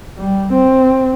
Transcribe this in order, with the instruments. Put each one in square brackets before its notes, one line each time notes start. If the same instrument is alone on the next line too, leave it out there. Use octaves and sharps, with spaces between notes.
[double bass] G3
C4